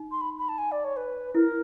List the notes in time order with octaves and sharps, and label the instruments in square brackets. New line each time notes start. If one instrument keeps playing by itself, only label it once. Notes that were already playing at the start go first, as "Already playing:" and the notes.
Already playing: [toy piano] D#4
[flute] C6
B5
B5
A5
G#5
D5
C#5
B4
[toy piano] E4 [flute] A#4